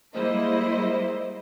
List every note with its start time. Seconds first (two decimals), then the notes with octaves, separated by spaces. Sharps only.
0.14 G3 G#3 A#3 E4 C5 D#5